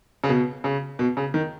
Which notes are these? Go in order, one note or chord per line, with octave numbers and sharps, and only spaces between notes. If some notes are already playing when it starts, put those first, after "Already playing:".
C#3
B2
C#3
B2
C#3
D#3